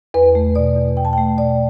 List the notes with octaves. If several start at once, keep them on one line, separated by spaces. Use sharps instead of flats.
E2 B4
A3
B2 D5
E2
E2 G5
A5
G5
A3
B2 D5